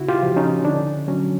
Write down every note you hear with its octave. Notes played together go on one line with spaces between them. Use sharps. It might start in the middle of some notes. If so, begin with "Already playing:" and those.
Already playing: C#3 E4 F#4
F4 G4
F3
C#4 D#4
D3 D4
F#3 C#4